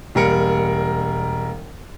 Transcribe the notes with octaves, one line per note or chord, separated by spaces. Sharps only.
E1 G3 A#3 A#4 F5 C#7